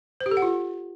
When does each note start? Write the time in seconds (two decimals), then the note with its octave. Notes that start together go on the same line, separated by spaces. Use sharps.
0.21 C5
0.26 G4
0.31 A4
0.37 F#5
0.42 F4